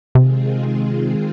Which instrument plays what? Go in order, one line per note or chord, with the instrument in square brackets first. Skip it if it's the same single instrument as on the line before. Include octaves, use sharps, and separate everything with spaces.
[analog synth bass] C3 [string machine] D#3 G#3 C4 F4 G#4